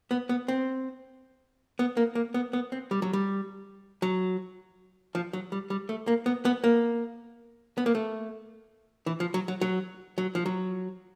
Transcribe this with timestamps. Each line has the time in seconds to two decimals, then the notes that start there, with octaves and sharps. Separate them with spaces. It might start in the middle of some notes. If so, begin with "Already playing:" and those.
0.11 B3
0.29 B3
0.48 C4
1.79 B3
1.97 A#3
2.15 A#3
2.34 B3
2.53 B3
2.72 C4
2.91 G3
3.02 F#3
3.13 G3
4.02 F#3
5.15 F3
5.33 F#3
5.52 G3
5.70 G3
5.89 A3
6.07 A#3
6.26 B3
6.45 B3
6.64 A#3
7.78 B3
7.86 A#3
7.95 A3
9.06 E3
9.20 F3
9.34 F#3
9.48 F#3
9.61 F#3
10.18 F#3
10.35 F3
10.46 F#3